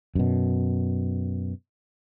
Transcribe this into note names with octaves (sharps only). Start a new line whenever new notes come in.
F#2 B2